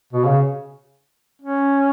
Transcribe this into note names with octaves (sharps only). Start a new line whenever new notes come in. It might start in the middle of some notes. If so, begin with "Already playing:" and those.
B2
C#3
C#4